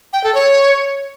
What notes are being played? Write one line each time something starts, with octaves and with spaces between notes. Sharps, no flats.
G5
A4
C#5